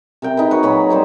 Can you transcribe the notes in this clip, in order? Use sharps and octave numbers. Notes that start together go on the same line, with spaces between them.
C3 A#4 G5
D#4 G#4 B4
F#4 B4 C#5
A#2 F#3 C#5 B5
G3 B4 C5 D#5